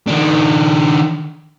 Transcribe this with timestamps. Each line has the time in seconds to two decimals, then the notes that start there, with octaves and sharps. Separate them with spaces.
0.07 D#3 D4